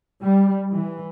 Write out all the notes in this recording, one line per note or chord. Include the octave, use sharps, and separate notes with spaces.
G3
E3